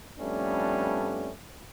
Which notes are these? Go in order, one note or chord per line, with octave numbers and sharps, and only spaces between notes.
F2 G3 A3 B3 C#4 D4